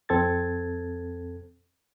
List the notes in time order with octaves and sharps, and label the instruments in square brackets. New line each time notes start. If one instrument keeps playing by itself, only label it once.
[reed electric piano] F2 C4 A4 G#6 A6